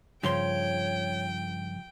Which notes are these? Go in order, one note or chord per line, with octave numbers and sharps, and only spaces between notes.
G2 C#3 F3 C#5 G5 C6